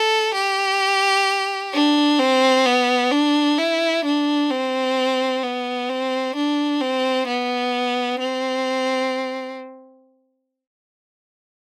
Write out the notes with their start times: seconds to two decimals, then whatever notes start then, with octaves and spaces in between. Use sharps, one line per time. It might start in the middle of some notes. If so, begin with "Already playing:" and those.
Already playing: A4
0.34 G4
1.73 D4
2.19 C4
2.66 B3
3.11 D4
3.58 E4
4.05 D4
4.50 C4
5.43 B3
5.89 C4
6.35 D4
6.81 C4
7.27 B3
8.19 C4